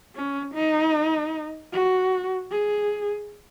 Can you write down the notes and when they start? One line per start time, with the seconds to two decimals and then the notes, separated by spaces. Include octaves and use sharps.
0.15 C#4
0.55 D#4
1.73 F#4
2.51 G#4